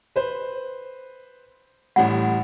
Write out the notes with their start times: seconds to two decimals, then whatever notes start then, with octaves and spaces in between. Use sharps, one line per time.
0.16 B4 C5
1.96 A1 A2 G3 F#5